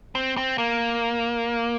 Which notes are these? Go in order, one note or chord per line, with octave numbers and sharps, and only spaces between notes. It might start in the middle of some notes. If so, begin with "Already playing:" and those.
C4
C4
A#3